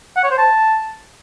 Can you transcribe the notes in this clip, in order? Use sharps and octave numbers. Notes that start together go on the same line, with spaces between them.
F#5
C#5
C5
A5